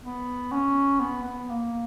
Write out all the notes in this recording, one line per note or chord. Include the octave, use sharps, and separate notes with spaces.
B3
C#4
B3
B3
A#3